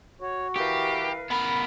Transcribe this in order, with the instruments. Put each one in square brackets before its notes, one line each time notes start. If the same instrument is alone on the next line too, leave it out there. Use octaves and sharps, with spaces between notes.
[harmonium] F#4 [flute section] C#5
[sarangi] E3 [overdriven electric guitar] G4 [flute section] A#4 B4 F5
[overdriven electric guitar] B3 A#4 [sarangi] B5